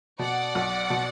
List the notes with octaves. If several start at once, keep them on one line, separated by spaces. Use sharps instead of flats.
B2 D5 F#5
B1
B2